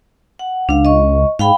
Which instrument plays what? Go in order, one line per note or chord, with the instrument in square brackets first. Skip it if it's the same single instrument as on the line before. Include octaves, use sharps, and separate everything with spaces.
[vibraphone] F#5
[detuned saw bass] C#2 [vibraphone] D4 F5
[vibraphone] D#5 C#6
[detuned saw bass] G#2 [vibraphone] F5 G5 B5